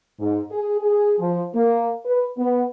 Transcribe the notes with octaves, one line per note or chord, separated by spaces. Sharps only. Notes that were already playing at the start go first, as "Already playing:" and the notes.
G#2
G#4
G#4
F3
A#3
B4
B3